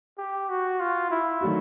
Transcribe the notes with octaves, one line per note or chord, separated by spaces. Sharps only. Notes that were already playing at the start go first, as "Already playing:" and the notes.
G4
F#4
F4
E4
D#3 F#3 A3 D4 F#4